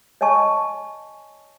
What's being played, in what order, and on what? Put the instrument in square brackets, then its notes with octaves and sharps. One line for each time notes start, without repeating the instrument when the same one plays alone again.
[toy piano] C#5 D#5 G#5 A5 C#6